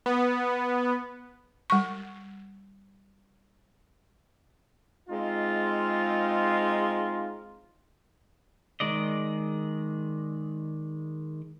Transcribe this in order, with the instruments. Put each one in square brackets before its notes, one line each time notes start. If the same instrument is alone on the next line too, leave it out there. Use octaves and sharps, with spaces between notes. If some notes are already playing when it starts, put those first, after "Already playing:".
[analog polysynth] B3
[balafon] G3 C#6
[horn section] G#3 C4 D#4 F4
[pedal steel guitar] D#3 G#3 D5 D#5